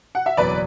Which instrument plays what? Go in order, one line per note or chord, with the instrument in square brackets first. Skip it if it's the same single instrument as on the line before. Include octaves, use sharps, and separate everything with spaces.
[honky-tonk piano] F#5
E5
[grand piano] F#1 E2 B2 F#3 [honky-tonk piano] B4 D5